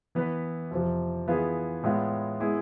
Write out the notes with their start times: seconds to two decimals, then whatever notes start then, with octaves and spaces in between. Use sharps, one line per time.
0.15 E3 B3 E4 B4
0.71 F2 C3 F3
1.27 E3 B3 F4 G#4 B4
1.83 A2 G#3 B3 F4
2.40 G#3 B3 E4 G#4